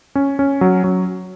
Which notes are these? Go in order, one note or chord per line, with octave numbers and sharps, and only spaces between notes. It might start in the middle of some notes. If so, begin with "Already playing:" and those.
C#4
C#4
F#3
F#3